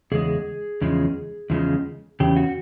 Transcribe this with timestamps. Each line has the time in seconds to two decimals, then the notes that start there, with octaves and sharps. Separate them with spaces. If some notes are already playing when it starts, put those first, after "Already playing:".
0.12 E2 C#3 G#3 G#4
0.81 E2 C#3 F3 G#3
1.50 E2 C#3 F3 G#3
2.20 E2 C#3 G4
2.36 F#4